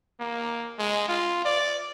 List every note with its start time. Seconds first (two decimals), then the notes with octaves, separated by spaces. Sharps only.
0.20 A#3
0.79 G#3
1.08 F4
1.45 D5